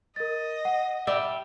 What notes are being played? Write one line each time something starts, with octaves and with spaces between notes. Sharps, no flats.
A#4 D#5 A6
F#5
G3 G4 D5 E5